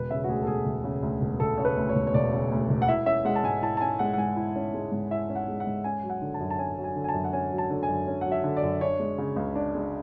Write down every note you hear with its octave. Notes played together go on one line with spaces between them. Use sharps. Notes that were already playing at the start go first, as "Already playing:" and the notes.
Already playing: E1 B4
C#3 E5
F#4
D2 G#4
A4
E1 G#4
E1
C#3
D2
E1
E1 A4
C#3 C#5
B4
D2
C#5
E1
C#5
E1 D5
C#3
D2
E1
F#5
E4 E5
C#4 E5
G#3 F#5
A5
G#2 G#5
E4 A5
A5
C#4 G#5
G#3 F#5
F#5
G#2 G#5
E4
C#4
G#3
G#2
E4 E5
C#4
F#5
G#3
F#5
G#2
C#4 G#5
F#3
F#5
D3
A5
F#2
A5
C#4 G#5
F#3
G#5
D3
G#5
A5
F#2
F#5
C#4 G#5
F#3
A5
D3
G#5
F#2
C#4
F#3 F#5
E5
D3
D5
F#2
D4 C#5
G#3
C#3
C#2
D4
G#3